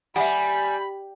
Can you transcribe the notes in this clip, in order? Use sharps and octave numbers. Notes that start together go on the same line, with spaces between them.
G3 E5 F#5 G#5 B5